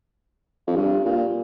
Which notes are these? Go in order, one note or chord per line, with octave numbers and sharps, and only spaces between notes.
F2
G2
A#2